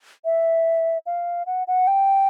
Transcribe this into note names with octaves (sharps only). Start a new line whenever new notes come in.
E5
F5
F#5
F#5
G5